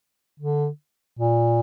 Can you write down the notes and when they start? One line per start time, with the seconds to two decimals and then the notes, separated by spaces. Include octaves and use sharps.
0.40 D3
1.19 A#2